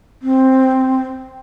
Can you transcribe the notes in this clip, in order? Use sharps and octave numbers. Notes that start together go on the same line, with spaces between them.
C4